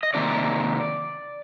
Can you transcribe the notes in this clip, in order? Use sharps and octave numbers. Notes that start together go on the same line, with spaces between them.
D#5
C3 D#3 A#3 D5